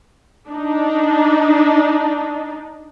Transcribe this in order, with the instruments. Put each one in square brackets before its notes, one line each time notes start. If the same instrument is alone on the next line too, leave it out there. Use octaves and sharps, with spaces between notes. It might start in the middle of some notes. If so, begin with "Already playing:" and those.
[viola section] D4 D#4